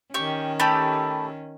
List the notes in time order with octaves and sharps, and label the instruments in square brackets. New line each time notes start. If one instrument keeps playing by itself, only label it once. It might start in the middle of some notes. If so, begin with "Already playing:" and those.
[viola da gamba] D#3 C#4 [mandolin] G4 C#6
[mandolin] A3 G4 [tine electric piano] A5 B5